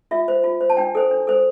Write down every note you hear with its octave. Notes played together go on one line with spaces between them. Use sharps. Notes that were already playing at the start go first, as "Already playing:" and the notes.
F4 E5
C5
F4
C5
A5
D4 G5
A4 C5
D4
A4 C5